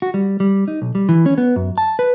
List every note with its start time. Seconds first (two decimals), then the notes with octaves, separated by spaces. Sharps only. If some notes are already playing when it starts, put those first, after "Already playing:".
0.02 F#4
0.14 G3
0.40 G3
0.68 D#4
0.82 B1
0.95 G3
1.09 E3
1.26 C#4
1.38 B3
1.56 F#2
1.78 A5
1.99 B4